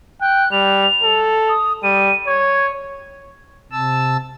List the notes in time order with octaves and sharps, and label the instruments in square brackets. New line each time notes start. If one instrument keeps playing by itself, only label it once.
[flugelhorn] G5 [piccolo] F#6
[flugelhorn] G3 [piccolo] F7
[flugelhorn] A4
[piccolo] D#6
[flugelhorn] G3 [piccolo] D#7
[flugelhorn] C#5 [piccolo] G#6
[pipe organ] C3 A5 E6